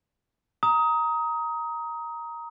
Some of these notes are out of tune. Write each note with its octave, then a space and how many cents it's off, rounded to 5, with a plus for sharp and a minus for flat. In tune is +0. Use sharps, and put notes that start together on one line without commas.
A#5 +0 D#6 +20